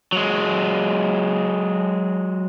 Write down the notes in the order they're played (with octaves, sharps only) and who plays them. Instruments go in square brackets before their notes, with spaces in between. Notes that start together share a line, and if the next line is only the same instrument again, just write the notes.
[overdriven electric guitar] F#3 G#3